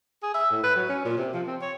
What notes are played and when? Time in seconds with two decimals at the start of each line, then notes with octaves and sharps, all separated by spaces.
0.23 G#4
0.34 E5
0.51 A2
0.64 B4
0.76 F#3
0.89 C#4
1.05 A#2
1.17 C3
1.33 F3
1.47 C4
1.61 C#5